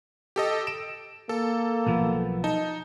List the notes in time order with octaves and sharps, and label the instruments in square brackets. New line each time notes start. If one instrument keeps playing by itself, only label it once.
[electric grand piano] G4 A4 D#5
D7 E7
[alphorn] A#3 [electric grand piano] A4
[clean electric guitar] B1 F3 B3
[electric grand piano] D#4 [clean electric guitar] A5